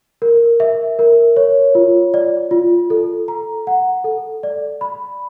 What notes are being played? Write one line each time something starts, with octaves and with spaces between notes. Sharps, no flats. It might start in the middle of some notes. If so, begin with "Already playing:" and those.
A#4
E5
A#4
C#5
F4
D5
F4
A4
A#5
F#5
A4
D5
B5